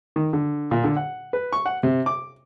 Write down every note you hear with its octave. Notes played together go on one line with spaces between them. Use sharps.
D#3
D3
A#2
D3
F#5
B4
C#6
F#5
C3
D6